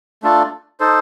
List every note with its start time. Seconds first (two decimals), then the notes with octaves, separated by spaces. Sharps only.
0.23 A3 D4 F4 A4
0.80 D#4 A4 C5